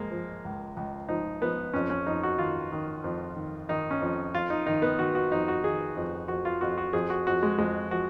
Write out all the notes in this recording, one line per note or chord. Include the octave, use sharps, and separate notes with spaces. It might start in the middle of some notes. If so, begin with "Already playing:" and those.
Already playing: C#2 F3 G#3 A#3
F3
C#2
C#2
F3 D#4
F3 B3
F2 C#4
C#4
F2 D#4
F#4
D#3 F4
D#3
F2
D#3
D#3 D#4
C#4
F2
F2 F4
D#4
D#3 D#4
B3
D#3 F#4
F#4
F2 D#4
F#4
D#3 G#4
F2
F2 F#4
F4
F2 F#4
F#4
F2 G#4
F#4
F2 F#4
G#3
F2 G#3
F3 F#4